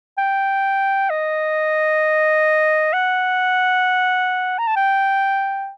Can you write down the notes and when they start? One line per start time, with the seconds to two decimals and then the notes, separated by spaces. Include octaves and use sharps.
0.18 G5
1.10 D#5
2.93 F#5
4.58 A#5
4.67 A5
4.76 G5